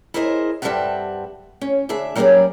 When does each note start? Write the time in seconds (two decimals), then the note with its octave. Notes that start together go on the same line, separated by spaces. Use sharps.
0.14 E4 G#4 A#4 C5 D5 D#5
0.62 G2 G3 C4 A4 E5 F#5
1.61 C#4
1.89 D2 D4 G#4 E5
2.16 F#3 G3 A#3 C#4 G#4 D5